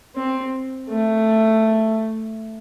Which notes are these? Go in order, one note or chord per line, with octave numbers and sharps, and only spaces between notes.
C4
A3